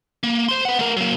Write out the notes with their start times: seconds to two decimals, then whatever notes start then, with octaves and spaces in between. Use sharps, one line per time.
0.23 A#3
0.49 C5 C6
0.65 B4 F#5
0.79 A3 A#4
0.97 F#3 A#3